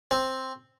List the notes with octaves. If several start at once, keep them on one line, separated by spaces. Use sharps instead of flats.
C4